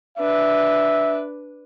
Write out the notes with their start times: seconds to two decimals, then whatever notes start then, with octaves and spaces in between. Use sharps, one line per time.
0.18 D4 B4 E5